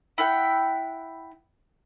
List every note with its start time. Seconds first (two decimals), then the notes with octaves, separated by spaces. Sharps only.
0.18 E4 F#5 G5